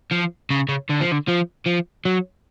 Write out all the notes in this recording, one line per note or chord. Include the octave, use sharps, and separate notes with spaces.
F3
C#3
C#3
D3
F3
D3
F3
F3
F#3